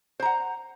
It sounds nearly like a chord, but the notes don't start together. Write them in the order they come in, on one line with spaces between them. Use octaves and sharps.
C5 A#5 F#5